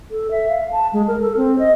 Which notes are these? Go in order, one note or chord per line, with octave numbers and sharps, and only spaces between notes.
A4
E5
F5
A5
G#3
A#4
A4
C4
D#5